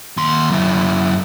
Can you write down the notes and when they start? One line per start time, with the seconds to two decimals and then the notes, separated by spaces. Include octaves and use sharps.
0.17 D#2 C6
0.51 F#2 E4